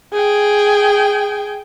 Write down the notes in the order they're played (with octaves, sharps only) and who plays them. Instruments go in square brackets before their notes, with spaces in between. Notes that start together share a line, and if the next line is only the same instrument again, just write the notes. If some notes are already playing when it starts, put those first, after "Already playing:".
[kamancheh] G#4 G5